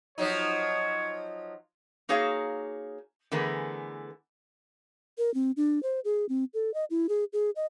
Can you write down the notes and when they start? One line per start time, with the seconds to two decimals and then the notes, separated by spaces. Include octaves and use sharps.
0.18 F3 F#3 D#4 C#5
2.09 A#3 D#4 F#4 G#4 C#5 F5
3.32 D3 E3 A3 B3 G#4 A#4
5.18 A#4
5.34 C4
5.57 D4
5.83 C5
6.05 G#4
6.29 C4
6.54 A4
6.74 D#5
6.90 E4
7.09 G#4
7.33 G#4
7.56 D#5